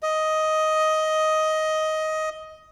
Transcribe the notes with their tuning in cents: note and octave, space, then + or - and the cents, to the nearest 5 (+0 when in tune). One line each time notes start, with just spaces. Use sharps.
D#5 +10